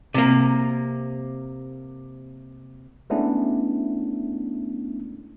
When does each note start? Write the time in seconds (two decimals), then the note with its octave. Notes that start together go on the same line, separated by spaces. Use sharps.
0.14 C3 A#3
3.10 G#3 A3 B3 C#4 D4 E4